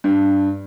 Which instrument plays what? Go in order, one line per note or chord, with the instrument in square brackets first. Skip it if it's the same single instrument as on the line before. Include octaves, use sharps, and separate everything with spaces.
[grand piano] G2